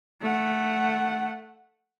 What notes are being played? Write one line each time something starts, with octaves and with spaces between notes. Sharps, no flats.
A3 F#5